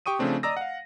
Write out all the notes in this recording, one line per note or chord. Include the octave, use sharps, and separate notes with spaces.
G4 G5 C#6 D#6 D#7
C#3 F3 A3 C4 D4
D5 D#5 A#5 D#6 E6 A#6
F5 F#5